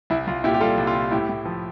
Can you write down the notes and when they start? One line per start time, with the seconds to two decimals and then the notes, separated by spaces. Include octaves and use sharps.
0.10 C2 E4
0.27 C2 F4
0.44 A#2 E4 G4
0.54 G4
0.61 G3 F4 A4
0.78 C2
0.87 F4
0.94 C2
1.11 A2 E4 G4
1.29 A2
1.46 F3